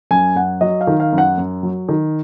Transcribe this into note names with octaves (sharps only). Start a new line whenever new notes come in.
F#2 G#5
F#2 F#5
F#3 D#5
F5
D#3
F5
F#2
F#5
F#2
F#3
D#3